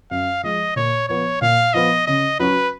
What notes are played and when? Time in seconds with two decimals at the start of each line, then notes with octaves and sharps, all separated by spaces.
0.11 F#2 F5
0.44 F3 G#3 D#5
0.76 A#2 C#5
1.08 F3 B3 C#5
1.41 A#2 F5
1.74 F3 B3 D#5
2.07 C#3 D#5
2.39 F#3 C#4 F#4 B4